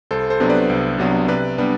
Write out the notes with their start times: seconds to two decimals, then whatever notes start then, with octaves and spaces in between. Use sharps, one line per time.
0.11 C2 A4 C5
0.30 A4 C5
0.40 C3 F#3 B3 D4
0.49 B4 D5
0.69 C2
0.98 C3 F#3 B3 D4
1.28 C3 B4 D5
1.58 G3 B3 D4